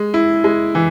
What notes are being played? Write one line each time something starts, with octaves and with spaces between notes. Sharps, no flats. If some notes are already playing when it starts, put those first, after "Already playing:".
Already playing: G#3
E4
G#3
E3